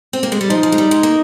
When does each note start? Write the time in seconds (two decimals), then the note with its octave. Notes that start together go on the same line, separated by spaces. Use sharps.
0.13 C4
0.23 A#3
0.32 G#3
0.41 G3
0.50 F3 D#4
0.63 F3
0.72 G#3
0.78 G3
0.91 G#3
1.03 A#3